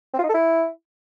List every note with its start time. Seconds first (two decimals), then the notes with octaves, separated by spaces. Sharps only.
0.13 C4
0.19 F4
0.24 D#4
0.29 A4
0.34 E4